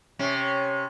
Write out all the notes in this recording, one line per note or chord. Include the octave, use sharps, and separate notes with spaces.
C3 C#4